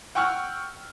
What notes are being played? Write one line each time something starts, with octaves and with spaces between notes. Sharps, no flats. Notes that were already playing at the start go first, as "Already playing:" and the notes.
F#5 G5 C#6 E6 F6